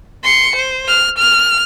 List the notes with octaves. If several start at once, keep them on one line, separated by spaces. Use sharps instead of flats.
C6 C#7
C5
F6
F6